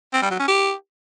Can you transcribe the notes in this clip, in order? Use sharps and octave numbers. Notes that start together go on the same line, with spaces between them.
C4
G3
F#3
C#4
G4